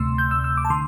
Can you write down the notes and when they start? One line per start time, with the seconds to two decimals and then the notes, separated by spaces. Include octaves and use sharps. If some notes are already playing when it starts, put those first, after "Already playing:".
Already playing: D2 C3 A3 C6 E6
0.18 G6
0.31 E6
0.44 E6
0.57 D6
0.65 A5
0.70 D3 C6